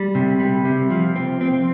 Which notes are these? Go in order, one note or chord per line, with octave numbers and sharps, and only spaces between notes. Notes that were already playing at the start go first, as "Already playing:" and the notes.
Already playing: G3
C3
G3
C3
F3
C4
C4